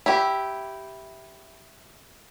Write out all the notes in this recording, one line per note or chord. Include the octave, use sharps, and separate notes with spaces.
E4 G4